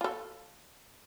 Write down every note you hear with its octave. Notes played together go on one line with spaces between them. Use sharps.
F4 A4